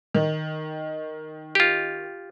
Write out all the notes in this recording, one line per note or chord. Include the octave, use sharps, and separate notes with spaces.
D#3
F4 G4